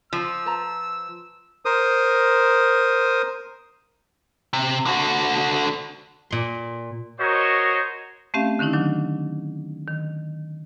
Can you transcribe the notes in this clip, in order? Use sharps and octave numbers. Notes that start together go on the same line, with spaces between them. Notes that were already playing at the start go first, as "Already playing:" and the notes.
F3 E6
B4 A5 A#5
A#4 C5 D#6
C3
D3 F#4
A#2 C6
F#4 A#4 C5 C#5 D#5
A3 C4 C#4 G4 E5 F5
D3 D#3 C#4 D#4 E4
D#3 F#3 D4
D#3